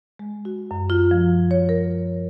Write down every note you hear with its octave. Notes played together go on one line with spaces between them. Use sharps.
G#3
F#4
F#2
F4
F3
C#5
A#4